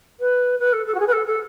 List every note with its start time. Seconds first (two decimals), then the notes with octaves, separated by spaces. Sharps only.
0.20 B4
0.59 B4
0.73 A4
0.86 A4
0.94 F#4
0.99 G#4
1.07 B4
1.12 A4
1.26 A4